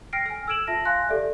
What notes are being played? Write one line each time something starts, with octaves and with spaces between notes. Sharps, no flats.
G5 F6 A#6 C7 D7
G#5 F6
E6 F6 G#6 D7 E7 F#7
F4 E5 A5 A#6
F5 G#5 C6 F#6 A#6
G4 A4 D5 E5